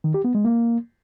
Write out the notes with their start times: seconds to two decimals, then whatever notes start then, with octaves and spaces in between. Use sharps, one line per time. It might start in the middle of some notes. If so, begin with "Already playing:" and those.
0.04 D#3
0.14 G4
0.24 B3
0.35 G#3
0.45 A#3